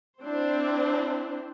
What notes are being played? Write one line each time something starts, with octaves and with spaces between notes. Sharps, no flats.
C4 D4 E4 C5